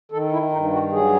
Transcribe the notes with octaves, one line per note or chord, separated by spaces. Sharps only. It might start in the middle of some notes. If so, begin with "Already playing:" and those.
D#3 A4
E4
G2 D#4
F#4
F#3 G#4